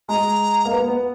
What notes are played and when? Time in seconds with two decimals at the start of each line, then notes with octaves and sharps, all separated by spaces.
0.09 G#3 A#5
0.65 A#3
0.71 B3
0.88 B3